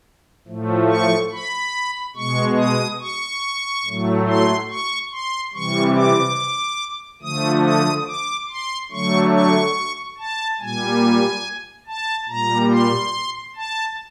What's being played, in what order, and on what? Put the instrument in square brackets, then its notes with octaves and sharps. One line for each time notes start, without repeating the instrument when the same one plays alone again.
[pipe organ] A2 F3 A3
C#6
B5
B2 G#3 C#6
D#6
C#6
A2 F#3 A3
C6
C#6
C6
C3 E3 G3 C#6
D6
D3 F3 A3 D#6
D#6
D6
C6
D3 F#3 A3 C#6
C#6
A5
A#2 G3 G#5
A5
A#2 G3 A#5
C6
A5